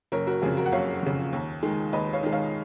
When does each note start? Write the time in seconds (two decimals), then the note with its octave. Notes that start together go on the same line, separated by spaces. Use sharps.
0.12 F#1 A#4 C#5
0.27 F#4 A#4
0.42 F2 C#3 F4 G#4
0.57 F#4 A#4
0.66 F#5
0.72 F#1 C#5 F5
1.03 F2 C#3
1.33 D#2
1.63 D#3 G#3
1.93 D#2 B4 D#5
2.13 C#5 F5
2.23 D#3 G#3
2.33 C#5 F5